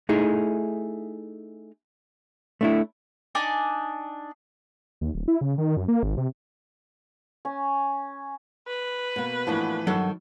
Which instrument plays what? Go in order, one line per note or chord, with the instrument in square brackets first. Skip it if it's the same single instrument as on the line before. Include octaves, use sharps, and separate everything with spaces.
[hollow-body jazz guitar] A3 D#4 E4 G#4
A3 D4 E4
[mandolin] D4 D#4 G#5 D6
[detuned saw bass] D#2
D1
E4
C#3
D#3
F#2
A#3
G#1
C3
[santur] C#4
[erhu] B4
[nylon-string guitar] B2 A#3
[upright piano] A2 E3 F3 [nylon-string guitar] A#3 D4 F#4
[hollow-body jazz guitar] G2 F#3 F#5 [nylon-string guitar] D#3 A4